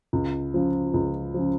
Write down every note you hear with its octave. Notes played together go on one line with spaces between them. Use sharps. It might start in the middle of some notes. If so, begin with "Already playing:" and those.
C#2
C#3 F3
C#2
C#3 F3